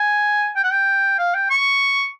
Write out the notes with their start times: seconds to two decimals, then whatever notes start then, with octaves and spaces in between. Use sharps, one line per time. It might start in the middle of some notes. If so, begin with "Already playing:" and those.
Already playing: G#5
0.56 G5
0.64 F#5
0.72 G5
1.19 F5
1.35 G5
1.50 C#6